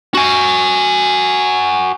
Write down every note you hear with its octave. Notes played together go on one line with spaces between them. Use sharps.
F#4 G#5